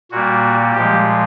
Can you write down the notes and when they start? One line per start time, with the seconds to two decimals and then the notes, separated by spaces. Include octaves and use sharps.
0.11 A#2 G3 A#3 F#4
0.75 A#2 F3 G#3 G4